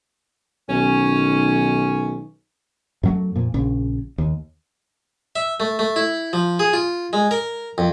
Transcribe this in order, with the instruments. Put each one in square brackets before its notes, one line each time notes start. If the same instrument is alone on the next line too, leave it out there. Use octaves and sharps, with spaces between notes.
[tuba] B1 [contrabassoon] D#3 [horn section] C#4
[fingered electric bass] F#2 F#3 A3
F2 A#2
A#1 C#3
D#2
[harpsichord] E5
A3
A3
E4
F3
G#4
F4
G#3
A#4
F2